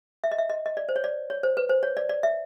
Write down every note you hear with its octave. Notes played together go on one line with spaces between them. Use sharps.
E5
D#5
E5
D#5
D#5
D5
C5
C#5
D5
C#5
C5
B4
C5
C#5
D5
D5
E5